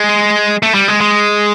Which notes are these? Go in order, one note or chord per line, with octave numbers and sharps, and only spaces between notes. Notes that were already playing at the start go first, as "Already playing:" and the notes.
Already playing: G#3
A3
G3
G#3
G#3